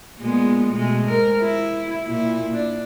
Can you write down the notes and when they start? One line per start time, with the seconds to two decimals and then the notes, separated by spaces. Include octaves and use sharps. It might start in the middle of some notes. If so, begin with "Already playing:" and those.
0.20 A#2 G#3 B3
0.73 B2 G#3 A3
1.06 G#2 A#4
1.41 E4
2.06 A#2 E4
2.53 D4